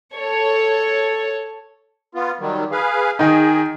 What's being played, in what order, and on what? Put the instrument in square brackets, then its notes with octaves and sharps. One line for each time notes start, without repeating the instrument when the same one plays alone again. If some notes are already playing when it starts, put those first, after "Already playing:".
[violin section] A4 C#5
[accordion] B3 F4
D#3 F#3 G3
G#4 B4 F5
[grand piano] D#3 D#4 [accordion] G#4